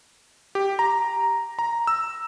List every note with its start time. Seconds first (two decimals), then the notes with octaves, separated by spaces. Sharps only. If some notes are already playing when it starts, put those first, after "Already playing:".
0.55 G4
0.79 A#5
1.59 A#5
1.87 E6